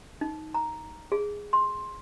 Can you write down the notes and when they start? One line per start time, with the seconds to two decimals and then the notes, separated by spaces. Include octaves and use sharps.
0.21 D#4
0.54 A#5
1.12 G#4
1.53 C6